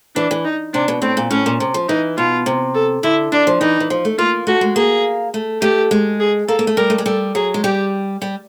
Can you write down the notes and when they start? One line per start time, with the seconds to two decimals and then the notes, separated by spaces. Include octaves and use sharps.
0.15 E3 D4
0.31 E3
0.45 D#4
0.73 C3 D4
0.88 B2
1.02 A2 C4
1.17 A#2
1.31 A2 C#4
1.46 A#2
1.60 C3
1.74 F3
1.88 E3 D#4
2.18 B2 F4
2.46 C3
2.75 A4
3.03 D3 E4
3.32 D3 D4
3.47 F3
3.61 E3 D#4
3.80 E3
3.90 F3
4.05 A3
4.19 A#3 F4
4.47 A3 F#4
4.61 G#3
4.76 A#3 G#4
5.34 A3
5.62 A3 G4
5.91 G#3
6.20 G#4
6.48 A#3 A4
6.59 A#3
6.67 A3
6.77 G3 A#4
6.90 A3
6.98 G#3
7.06 G3 A4
7.35 F#3 G#4
7.54 G#3
7.64 G3 G4
8.22 G3